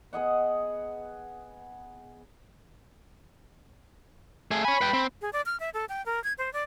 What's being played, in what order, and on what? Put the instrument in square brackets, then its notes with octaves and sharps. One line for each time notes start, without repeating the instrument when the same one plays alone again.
[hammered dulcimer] B3 G#4 D#5 F#5
[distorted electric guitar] A3 G#4
[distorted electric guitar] C#5 G#5 [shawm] B5
[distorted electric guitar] B4 G5
C4
[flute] G#4
D5
F6
E5
A4
G5
A#4
G#6
C5
D5